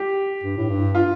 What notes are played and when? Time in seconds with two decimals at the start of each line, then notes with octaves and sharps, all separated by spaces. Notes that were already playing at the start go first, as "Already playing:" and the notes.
Already playing: G4
0.44 G2
0.57 A2
0.70 G2
0.95 F4